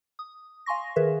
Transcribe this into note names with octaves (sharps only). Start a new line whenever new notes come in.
D#6
F5 G#5 C6 C#6 A#6
D#3 G#4 A#4 B4 E5